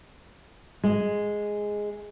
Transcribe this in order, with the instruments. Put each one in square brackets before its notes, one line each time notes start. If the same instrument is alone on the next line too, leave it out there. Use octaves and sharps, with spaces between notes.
[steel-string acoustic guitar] G#3